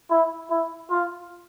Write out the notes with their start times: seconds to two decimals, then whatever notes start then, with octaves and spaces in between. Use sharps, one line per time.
0.10 E4
0.50 E4
0.90 F4